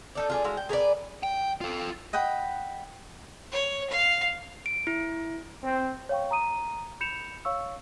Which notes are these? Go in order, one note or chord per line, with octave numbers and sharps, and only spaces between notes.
D#4 A4 D5
F4 G#4 D5
G#3 E4 F#4 F5
G5
G#4 A#4 B4 D5
G5
F4 A4
D#5 F#5 G5 B5
C#5
F5
D7
E4
C4
C#5 F5 G5 C#6
A#5 D#6 D#7
B5 G6 C#7 E7 F7
C#5 F5 C#6 E6